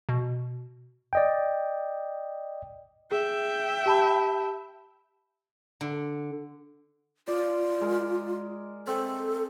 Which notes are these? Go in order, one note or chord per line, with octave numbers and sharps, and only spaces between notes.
B2
D5 D#5 G5
G#4 E5 G5
G4 A5 B5
D3
F4 D5
G#3 A#4
C4 A4